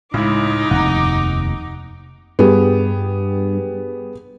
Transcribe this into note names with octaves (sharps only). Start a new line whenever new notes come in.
C#2 A2 D#4 E4 D6
F1 D#2 F#5 A#5
G2 B3 G4 G#4